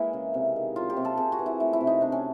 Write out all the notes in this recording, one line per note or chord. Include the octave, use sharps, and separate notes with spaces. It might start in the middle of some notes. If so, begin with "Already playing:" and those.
Already playing: E3 G#3 A#3 E4
C#3
C3
D#3
F#3 F4
G4
C3
A4
C3 G#4
F#4
E3
E4
A3 E4
E4
C3
D#4
C3 D4
C#4